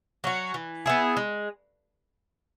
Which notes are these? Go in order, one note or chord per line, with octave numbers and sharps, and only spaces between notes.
F#3 C#4 F#4
E3
B3 E4 G#4
G#3